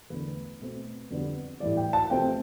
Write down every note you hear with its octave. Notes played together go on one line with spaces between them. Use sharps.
E2 D3 A3 B4
B2 A3 C4
F2 D3 G3 B3
A2 E3 G3 D5
G5
A5
C3 F3 A3 C4 G5